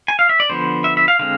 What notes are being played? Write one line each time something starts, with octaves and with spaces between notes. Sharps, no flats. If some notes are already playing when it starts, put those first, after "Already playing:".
G#5
F5
E5
D5
D3 F3 B3 C5
E5
E5
F5
D3 G#3 C4 F5